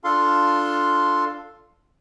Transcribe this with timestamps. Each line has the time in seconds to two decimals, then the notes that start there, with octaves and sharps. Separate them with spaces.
0.04 D4 F4 A4 F5 C6